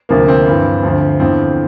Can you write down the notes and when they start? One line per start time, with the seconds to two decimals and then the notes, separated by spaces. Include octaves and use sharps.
0.09 D2 C3 F3 A#3
0.28 C4
0.46 G2 E3
0.83 D2 D3 F3
1.20 E2 D3 F3 C4